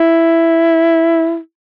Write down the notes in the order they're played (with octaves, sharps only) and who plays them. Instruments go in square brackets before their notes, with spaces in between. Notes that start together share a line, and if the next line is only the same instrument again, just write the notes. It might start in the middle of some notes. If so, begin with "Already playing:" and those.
Already playing: [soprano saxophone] E4